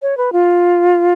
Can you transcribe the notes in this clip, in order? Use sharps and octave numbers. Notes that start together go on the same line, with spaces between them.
C#5
B4
F4